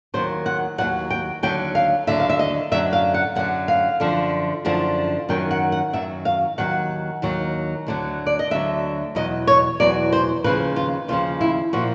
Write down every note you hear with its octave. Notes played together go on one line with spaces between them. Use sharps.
D#2 D#3 F#3 C5
F#5
D#2 D#3 F#3 F#5
G5
D#2 D3 F#3 G5
F5
D#2 D3 F#3 E5
F5
E5
D#5
F#2 D3 F#3 E5
F5
F#5
F#2 D3 F#3 F#5
F5
F#2 D3 F3
F#2 D3 F3
F#2 D#3 F#3 G5
F#5
F#5
F#2 D#3 F#3 E5
F5
D#2 D#3 F#3 F#5
D#2 D#3 F#3
D2 D3 F#3
D5
D#5
D2 D3 F#3 E5
E2 B2 F#3 D#5
C#5
E2 B2 F#3 D5
C5
D#2 C#3 F3 B4
F4
D#2 C#3 F3 F4
E4
A#2 F3 F#4